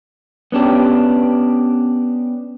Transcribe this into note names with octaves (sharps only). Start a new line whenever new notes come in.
B3 C#4 D4 G4